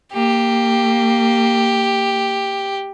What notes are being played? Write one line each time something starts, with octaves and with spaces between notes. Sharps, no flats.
A#3 G4